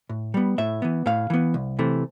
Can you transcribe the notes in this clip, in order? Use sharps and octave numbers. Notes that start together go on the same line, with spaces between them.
A2
G3 B3
A2 E5
E3 B3
A2 F5
E3 B3
C2
C3 E3 A3